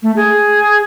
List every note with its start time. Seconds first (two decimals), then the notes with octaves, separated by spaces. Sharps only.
0.03 A3
0.16 G#4